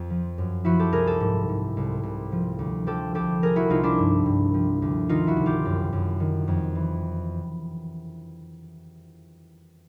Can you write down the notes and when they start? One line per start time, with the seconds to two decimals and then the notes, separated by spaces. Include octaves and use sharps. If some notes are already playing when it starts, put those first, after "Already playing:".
Already playing: F2
0.10 F3
0.38 F#2
0.65 F3 E4 F#4
0.79 G4 A4
0.92 C2 G#4 A#4
1.06 G4 A4
1.20 G#2
1.49 G#2
1.77 C2
2.03 C2
2.32 F3
2.59 D2
2.87 F3 G4 A4
3.15 C2 G4 A4
3.42 F3 G#4 A#4
3.56 E4 F#4
3.70 C2 D#4 F4
3.84 D4 E4
3.99 G2
4.26 G2
4.54 F3
4.82 D2
5.09 D#3 D#4 F4
5.27 E4 F#4
5.37 C2
5.46 F4 G4
5.65 F#2
5.93 F#2
6.20 D#3
6.48 F2
6.75 E3